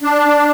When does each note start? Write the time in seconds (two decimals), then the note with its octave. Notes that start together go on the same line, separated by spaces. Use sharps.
0.01 D4